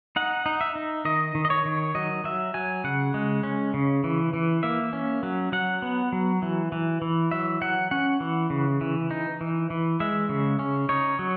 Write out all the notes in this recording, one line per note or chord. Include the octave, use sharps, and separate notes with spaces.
D#4 F#5
D#4
E5
D#4
D#3 D#5
D#3
D#5
C#5
D#3
F#3 D#5
F#3 E5
F#3 G#5
C#3 F#5
G#3
C#4
C#3
E3
E3
A#3 E5
C#4
F#3
F#3 F#5
B3
F#3
E3
E3
E3
F#3 E5
F#3 F#5
C#4 F#5
E3
C#3
E3
D#4
E3
E3
G#3 E5
C#3
C#4
D#4 C#5
F#3